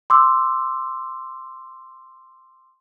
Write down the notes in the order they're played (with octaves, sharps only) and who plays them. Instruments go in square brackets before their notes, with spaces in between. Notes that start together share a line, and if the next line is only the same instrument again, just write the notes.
[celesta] C6 D6 E6